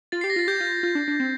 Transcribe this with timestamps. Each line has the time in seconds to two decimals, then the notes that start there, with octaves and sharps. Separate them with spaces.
0.12 F4 A6
0.21 G4 C7
0.30 A#6
0.36 F4 A6
0.48 G4 G6
0.60 F4
0.83 F4
0.95 D4
1.08 D4
1.20 C4